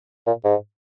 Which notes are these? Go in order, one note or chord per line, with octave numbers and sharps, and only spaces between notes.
A#2
G#2